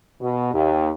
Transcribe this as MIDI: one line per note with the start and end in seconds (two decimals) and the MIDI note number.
0.21 0.52 47
0.54 0.91 39